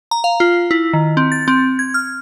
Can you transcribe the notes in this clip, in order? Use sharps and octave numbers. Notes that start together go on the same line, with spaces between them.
A#5
F5
F4
E4
D#3
C4
A6
C4
G#6
F6